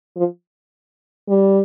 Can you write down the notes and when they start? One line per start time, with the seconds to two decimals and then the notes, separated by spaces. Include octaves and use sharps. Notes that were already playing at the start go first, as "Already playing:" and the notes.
0.16 F3
1.29 G3